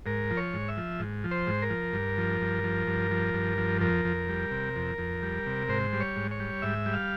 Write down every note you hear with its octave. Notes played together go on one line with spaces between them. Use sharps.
G#2 A#4
F3
C#5
G#2
E5
F3
G#2
F3
C5
G#2
A#4
F3
G2
F3
G2
F3
G2
F3
G2
F3
F2 A#4
F2
G3
C3
F2
F2
G3
C3
G#2 C5
G3
C#5
G#2
C#5
G3
G#2 E5
G3
F5